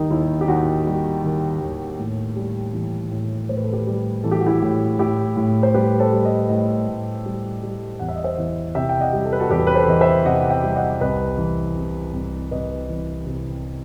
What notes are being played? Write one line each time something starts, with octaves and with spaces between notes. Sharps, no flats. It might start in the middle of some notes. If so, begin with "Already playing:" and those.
Already playing: D#2 D#3 G3 D#4
D#2 E4
G4
D#2 D#4 F#4
G3
D#3
D#2
A2
G3
E3
A2
A2 C5
B4
A4
G4 B4
G3
E3 A4
G4
F#4
E4 G4
A2
A2 E4 G4
A2
C5
G3 G4 B4
A4 C5
G3
B4 D#5
A2 B4 D#5
A2
G3
G3
E2 F#5
E5
D#5
C5 E5
E3
C3 E5 G5
G5
D#5 F#5
G3
A4
B4
F#4 A4
E2 G4 B4
B4
A4 C5
E3 D#5
C5 E5
C3 D#5 F#5
F#5
E5 G5
G3
D#5 F#5
C2 B4 D#5
E3
C3
C2
C2 B4 D#5
E3
C3